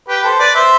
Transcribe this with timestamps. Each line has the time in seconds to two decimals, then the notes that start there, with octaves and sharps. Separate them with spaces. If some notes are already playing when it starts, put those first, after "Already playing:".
0.08 G4 B4
0.24 A4 C5
0.39 B4 D5
0.55 C5 E5